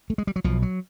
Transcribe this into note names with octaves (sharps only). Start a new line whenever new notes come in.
A3
G#3
G3
F#3
B1 B2 F3
F#3